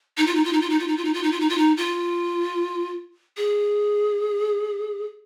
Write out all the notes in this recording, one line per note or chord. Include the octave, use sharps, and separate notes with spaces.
D#4
F4
D#4
F4
D#4
F4
D#4
F4
D#4
F4
D#4
F4
D#4
F4
D#4
F4
D#4
F4
G#4